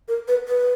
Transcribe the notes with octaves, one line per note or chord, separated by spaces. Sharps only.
A#4
B4
B4